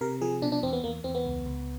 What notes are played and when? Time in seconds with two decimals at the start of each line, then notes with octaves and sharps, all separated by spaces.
0.01 C3 A#4
0.21 F3 G#4
0.42 B2 D4
0.52 D4
0.63 E2 C4
0.73 B3
0.84 E2 A#3
1.04 E2 C4
1.15 B3
1.25 C#2
1.46 C#2